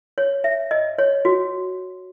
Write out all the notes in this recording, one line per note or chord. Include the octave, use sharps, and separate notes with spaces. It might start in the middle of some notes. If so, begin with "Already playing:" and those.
C#5
E5
D#5
C#5
F#4